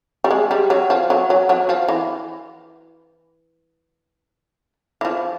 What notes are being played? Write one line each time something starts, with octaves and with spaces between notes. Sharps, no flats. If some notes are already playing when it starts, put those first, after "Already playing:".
G3
G#3
G3
F#3
F3
F#3
F#3
F#3
F3
E3
E3
F3